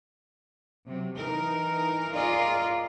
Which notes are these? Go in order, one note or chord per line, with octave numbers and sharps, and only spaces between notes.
C3 F#3
E3 D#4 A#4
F4 G#4 A#4 D5 D#5